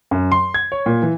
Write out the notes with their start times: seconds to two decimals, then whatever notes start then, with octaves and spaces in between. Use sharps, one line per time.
0.11 F#2
0.32 C6
0.54 G#6
0.72 C#5
0.86 A#2
1.02 E3